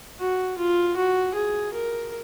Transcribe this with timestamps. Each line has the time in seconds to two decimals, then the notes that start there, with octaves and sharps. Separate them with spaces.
0.20 F#4
0.58 F4
0.97 F#4
1.35 G#4
1.73 A#4